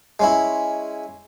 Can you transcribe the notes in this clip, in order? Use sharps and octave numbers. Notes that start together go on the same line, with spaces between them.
G#3 C#4 E4